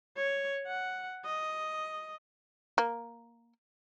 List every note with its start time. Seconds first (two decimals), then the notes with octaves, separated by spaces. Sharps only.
0.17 C#5
0.67 F#5
1.25 D#5
2.78 A#3